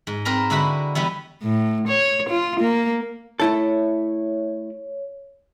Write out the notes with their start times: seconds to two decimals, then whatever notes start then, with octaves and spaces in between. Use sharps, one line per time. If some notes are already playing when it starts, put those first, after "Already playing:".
0.07 G#2
0.25 C4 A#4 B4 A#5
0.50 D3 G#3 E4 F#4 B4 B5
0.95 E3 G3 B3 E4
1.42 A2
1.88 C#5
2.29 F4
2.60 A#3
3.40 A3 E4 A4 C#5